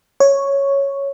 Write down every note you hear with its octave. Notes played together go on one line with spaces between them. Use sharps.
C#5